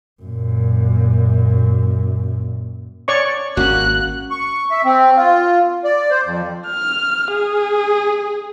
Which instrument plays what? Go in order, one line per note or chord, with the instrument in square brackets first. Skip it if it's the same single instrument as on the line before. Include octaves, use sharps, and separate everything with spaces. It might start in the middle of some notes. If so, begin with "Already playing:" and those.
[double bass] F#2 A#2
[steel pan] C#5 D5 C#6
[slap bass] G#1 C#4 [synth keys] A#3 F#4 [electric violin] F#6
[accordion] C#6
E5
C4
F4
D5
C5
F2
[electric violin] F6
G#4